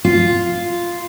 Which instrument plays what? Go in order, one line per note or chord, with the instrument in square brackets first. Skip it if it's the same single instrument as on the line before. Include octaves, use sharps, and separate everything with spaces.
[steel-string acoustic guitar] F4